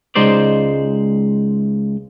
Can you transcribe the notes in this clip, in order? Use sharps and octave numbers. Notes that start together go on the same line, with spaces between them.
C#2 G#3 D#4 C5 D5